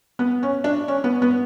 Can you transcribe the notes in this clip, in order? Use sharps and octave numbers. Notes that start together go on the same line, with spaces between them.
B3
C#4
D4
C#4
B3
B3